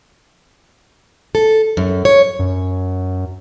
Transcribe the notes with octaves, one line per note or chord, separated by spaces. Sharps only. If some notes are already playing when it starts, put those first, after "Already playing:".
A4
F#2
C#5
F#2